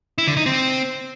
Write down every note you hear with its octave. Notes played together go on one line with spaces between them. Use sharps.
E4
D3
D#4
C4